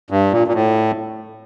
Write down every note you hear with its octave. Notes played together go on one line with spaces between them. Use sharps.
G2
A#2
A#2
A2